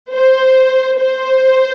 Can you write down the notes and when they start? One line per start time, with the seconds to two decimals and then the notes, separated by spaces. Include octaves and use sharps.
0.13 C5
0.99 C5